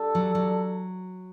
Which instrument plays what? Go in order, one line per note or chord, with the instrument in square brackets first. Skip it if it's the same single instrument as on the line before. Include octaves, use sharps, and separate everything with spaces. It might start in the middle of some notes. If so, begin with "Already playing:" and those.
Already playing: [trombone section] G3 D4 A4
[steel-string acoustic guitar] F#3
F#3